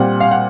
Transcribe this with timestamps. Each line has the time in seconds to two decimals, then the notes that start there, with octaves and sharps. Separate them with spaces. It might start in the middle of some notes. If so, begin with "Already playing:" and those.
Already playing: A#2 G3 C4 F#5
0.20 F5
0.31 F#5